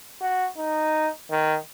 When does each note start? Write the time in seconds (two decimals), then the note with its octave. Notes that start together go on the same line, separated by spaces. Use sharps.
0.21 F#4
0.57 D#4
1.31 D#3